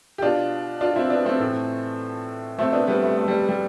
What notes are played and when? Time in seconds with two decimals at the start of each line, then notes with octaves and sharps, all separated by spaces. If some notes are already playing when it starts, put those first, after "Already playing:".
0.18 G4
0.22 B2 D4 F4
0.81 D4 F4
0.96 C4 E4
1.10 B3 D4
1.25 A3 C4
1.40 A2 E3
2.58 B2 A3 C4
2.73 B3 D4
2.87 G3 B3
3.03 A3
3.17 A3
3.28 G3
3.49 G3